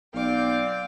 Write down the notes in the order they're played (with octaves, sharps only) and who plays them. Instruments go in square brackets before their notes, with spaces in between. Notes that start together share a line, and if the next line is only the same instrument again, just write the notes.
[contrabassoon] B1 [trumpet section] C4 D5 [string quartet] F5 G5 D6